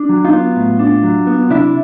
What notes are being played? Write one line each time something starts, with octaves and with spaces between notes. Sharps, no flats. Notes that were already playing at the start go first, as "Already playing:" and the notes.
Already playing: D4
F#3
D#4 F4
B3
A2
D4
F#3
B3
C3 D4 E4